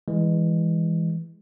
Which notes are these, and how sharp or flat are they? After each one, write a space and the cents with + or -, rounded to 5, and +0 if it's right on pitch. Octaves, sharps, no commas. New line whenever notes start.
E3 +0 G#3 -20